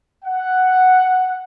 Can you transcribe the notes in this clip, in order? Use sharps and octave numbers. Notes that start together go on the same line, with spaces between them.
F#5